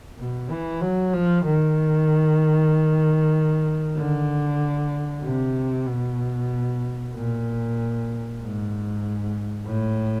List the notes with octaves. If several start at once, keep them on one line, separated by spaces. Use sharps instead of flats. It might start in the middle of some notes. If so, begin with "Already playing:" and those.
B2
E3
F#3
F3
D#3
D3
C3
B2
A#2
G#2
A2